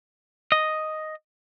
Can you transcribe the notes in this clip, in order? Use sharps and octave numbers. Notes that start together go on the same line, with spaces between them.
D#5